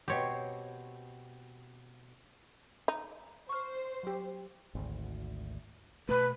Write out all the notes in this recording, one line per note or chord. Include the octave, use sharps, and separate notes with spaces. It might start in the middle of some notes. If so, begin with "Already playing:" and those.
B2 C4 G4 C#5
D#4
C5 C#6 F6
F#3 G4
G#1 D2
B2 A3 B4